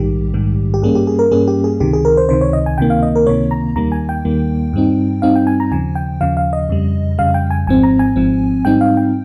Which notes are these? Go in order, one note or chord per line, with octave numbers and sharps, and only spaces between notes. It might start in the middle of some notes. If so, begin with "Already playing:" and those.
Already playing: A#1 G#2 D#3 G3 G4
A#1 G#2 D#3 G3
G4
G2 G3 A#3 C#4 G#4
G4
G#4
A#4
G2 G3 A#3 C#4 G#4
G4
G#4
C#2 C3 D#3 G4
G#4
A#4
C5
C#2 C3 D#3 C5
C#5
D#5
G#5
C#2 C3 D#3 A#3 G5
F5
D#5
A#4
C#2 C3 D#3 A#3 C#5
A#5
D#2 D#3 G3 A#3 A#5
G#5
G5
D#2 D#3 G3 A#3
G2 G3 C4 D#4
G2 G3 C4 D#4 F5
G5
G#5
A#5
D#2 C#3 F3 G#5
G5
D#2 C#3 F3 F5
F5
D#5
F2 C#3 G3
F2 C#3 G3 F5
G5
G#5
G#1 G#2 F3 C4 G#5
A#5
G#5
G#1 G#2 F3 C4
G#2 G3 C4 D#4 G5
F5
G5